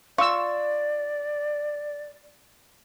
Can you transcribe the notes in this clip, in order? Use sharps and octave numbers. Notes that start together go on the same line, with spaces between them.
F4 D5 C#6 E6